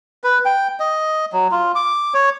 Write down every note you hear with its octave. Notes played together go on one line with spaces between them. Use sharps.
B4
G5
D#5
F#3
F4
D6
C#5